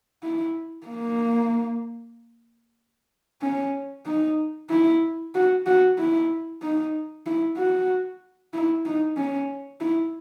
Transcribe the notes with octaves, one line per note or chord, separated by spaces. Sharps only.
E4
A#3
C#4
D#4
E4
F#4
F#4
E4
D#4
E4
F#4
E4
D#4
C#4
E4